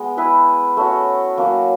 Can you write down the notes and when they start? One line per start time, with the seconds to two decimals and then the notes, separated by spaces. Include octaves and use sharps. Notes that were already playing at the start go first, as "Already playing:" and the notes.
Already playing: G#3 B3
0.17 E4 G#4 B4
0.77 A3 C#4 F#4
1.38 F#3 A#3 C#4